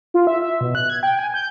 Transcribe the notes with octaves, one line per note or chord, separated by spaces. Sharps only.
F4
E5
E5
B2
F#6
G#6
G5
G#5
G6